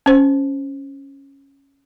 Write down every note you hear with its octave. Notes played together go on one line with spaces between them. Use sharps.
C#4 C5